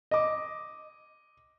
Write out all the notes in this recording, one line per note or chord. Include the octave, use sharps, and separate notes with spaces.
D#5 D6